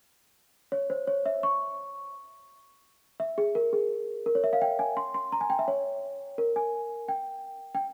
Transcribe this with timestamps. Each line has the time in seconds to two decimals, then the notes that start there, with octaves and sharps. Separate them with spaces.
0.72 C#5
0.90 C5
1.07 C#5
1.26 E5
1.43 C#6
3.20 E5
3.38 G#4
3.55 A#4
3.73 G#4
4.26 A#4
4.35 C#5
4.44 E5
4.53 F5
4.62 G5
4.79 G#5
4.97 C6
5.14 C6
5.32 A#5
5.41 G#5
5.50 G5
5.59 E5
5.68 C#5
6.38 A#4
6.56 G#5
7.08 G5
7.75 G5